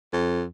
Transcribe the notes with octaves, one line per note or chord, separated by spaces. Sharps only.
F2